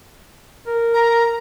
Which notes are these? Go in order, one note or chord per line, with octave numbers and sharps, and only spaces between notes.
A#4
A#5